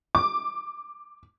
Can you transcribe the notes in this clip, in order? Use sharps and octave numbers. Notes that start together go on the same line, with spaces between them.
D6